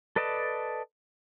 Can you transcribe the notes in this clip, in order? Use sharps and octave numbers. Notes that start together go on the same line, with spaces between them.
A4 B4 D5 D#5 A5